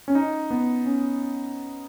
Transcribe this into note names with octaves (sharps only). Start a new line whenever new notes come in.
C#4
D#4
B3
C#4